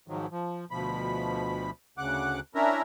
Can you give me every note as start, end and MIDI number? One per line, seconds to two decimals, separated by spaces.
0.08 0.26 44
0.08 0.26 51
0.08 0.26 53
0.08 0.26 54
0.31 0.65 53
0.71 1.71 38
0.71 1.71 47
0.71 1.71 53
0.71 1.71 83
1.98 2.40 38
1.98 2.40 49
1.98 2.40 78
1.98 2.40 86
1.98 2.40 90
2.55 2.82 61
2.55 2.82 62
2.55 2.82 64
2.55 2.82 70
2.55 2.82 76
2.55 2.82 82